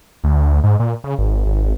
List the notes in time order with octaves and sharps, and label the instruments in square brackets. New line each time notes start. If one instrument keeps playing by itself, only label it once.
[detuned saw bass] D2
G#2
A#2
C#3
G#1
G#1